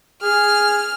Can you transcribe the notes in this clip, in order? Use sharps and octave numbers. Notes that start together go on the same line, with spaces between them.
G#4 F6